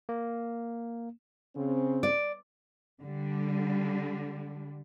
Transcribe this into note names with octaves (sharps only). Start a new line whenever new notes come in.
A#3
C#3 C4
D5
D3 G3